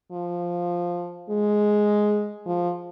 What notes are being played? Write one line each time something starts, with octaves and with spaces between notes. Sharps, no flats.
F3
G#3
F3